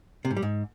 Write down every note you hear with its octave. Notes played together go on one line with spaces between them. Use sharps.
C3
G#2
G3
G#2